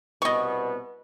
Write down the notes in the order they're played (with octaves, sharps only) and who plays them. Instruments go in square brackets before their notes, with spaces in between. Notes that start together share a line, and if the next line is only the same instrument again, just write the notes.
[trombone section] C2 B2 B3 [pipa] D#5 C#6